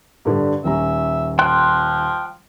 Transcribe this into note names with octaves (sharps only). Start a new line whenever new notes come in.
G2 D3
D#1 C#4 E5 A#5
F3 G5 C6 F#6